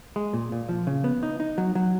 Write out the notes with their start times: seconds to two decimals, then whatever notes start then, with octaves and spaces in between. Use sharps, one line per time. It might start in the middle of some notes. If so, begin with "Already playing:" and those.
0.16 G#3
0.33 A#2
0.52 A#2
0.69 F3
0.87 C#3
1.04 B3
1.23 D#4
1.40 D#4
1.58 F#3
1.75 F#3